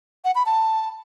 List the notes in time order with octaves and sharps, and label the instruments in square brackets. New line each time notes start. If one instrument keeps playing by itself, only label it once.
[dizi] F#5
B5
A5